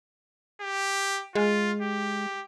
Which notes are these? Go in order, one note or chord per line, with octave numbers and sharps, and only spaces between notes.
G4
G#3 F4
G4